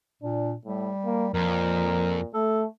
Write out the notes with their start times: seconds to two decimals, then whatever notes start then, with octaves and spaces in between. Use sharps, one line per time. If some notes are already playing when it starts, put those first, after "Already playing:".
0.22 A#2 D4
0.65 A2 G3
1.05 A#3
1.34 F2 A#2 A#4
2.34 A3 A4